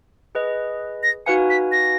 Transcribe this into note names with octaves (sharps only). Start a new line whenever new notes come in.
G#4 B4 D#5
A#6
D#4 F#4 B4 F5 G#5 C#7
B6
A#6